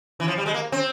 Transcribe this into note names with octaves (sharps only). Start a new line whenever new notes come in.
E3
F3
G3
G#3
A#3
C4